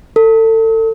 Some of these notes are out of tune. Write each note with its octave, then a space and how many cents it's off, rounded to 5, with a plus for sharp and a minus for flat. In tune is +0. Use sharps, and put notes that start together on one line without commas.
A4 +30